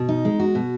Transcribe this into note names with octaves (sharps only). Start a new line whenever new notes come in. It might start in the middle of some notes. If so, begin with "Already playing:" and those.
Already playing: B2
D#4
G#3
F#4
B2